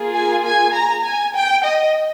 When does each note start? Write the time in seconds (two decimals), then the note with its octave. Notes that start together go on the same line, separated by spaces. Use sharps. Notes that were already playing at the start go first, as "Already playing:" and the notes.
Already playing: A#3 F4 G#4
0.14 G#5
0.44 G#5
0.74 A#5
1.05 G#5
1.34 G5
1.64 D#5